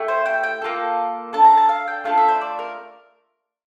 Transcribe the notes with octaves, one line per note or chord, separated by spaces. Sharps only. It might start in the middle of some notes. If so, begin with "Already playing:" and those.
Already playing: A3 E4 G4
C5
G5
G5
A#3 F4 A4
D4 A4 A5
A#5
A5
F5
G5
A3 D4 F4 A4 F5
E5
C5
D5
A#4